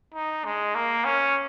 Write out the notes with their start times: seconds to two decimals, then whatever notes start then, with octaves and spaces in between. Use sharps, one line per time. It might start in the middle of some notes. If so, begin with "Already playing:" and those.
0.14 D#4
0.45 G#3
0.75 A#3
1.05 C#4